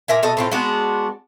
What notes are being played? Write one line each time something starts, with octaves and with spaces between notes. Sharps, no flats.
A#2 A#4 E5 G#5
B2 A4 D#5
A2 C4 F4
G#3 B3 D4 F#4